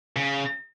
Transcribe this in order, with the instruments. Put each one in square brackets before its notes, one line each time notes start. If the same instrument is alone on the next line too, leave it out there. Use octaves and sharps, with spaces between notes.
[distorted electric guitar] C#3